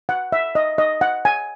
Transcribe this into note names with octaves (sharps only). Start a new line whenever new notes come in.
F#5
E5
D#5
D#5
F#5
G#5